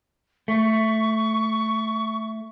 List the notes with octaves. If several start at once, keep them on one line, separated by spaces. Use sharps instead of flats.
A3 C#6